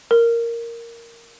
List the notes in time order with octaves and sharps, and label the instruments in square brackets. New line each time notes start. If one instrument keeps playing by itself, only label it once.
[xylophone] A#4